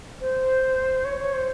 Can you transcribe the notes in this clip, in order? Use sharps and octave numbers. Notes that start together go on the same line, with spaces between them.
C5
C#5
C#5
C5